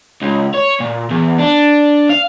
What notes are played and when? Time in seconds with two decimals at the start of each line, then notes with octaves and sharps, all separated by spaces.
0.22 C#2
0.55 C#5
0.80 A#2
1.10 E2
1.38 D4
2.09 F5